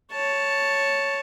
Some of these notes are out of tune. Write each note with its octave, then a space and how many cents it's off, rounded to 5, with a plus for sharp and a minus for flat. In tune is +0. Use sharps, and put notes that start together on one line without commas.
C#5 +0 A5 +0